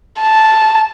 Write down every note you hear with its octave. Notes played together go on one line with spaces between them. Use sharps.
A5